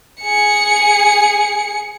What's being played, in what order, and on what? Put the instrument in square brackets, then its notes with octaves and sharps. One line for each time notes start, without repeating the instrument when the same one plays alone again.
[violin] G#4 C#7